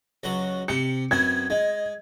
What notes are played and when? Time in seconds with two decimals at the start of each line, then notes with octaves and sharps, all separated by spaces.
0.23 C#2 F#3 F#5
0.68 C3 G4 C#7
1.11 F#2 B3 C4 G#6
1.50 G#3 D#5